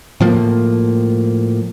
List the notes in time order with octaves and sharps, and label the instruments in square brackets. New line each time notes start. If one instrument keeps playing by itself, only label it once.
[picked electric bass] A2 F3 A#3